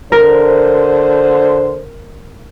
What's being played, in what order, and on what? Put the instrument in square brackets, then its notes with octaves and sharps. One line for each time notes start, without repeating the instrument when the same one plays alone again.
[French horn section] D3 C5 [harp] A#4